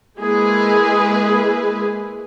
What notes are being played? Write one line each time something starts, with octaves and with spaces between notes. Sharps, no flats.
G#3 A#3 E4 G#4 B4